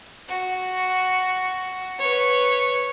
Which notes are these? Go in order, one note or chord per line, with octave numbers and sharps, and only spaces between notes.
F#4
B4 C#5